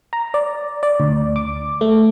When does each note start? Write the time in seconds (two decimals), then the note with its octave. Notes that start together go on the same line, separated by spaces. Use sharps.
0.13 A#5
0.34 D5
0.83 D5
1.00 D2
1.36 D6
1.81 A3